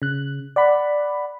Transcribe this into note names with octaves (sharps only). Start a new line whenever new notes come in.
C#3 F#6
D5 F#5 B5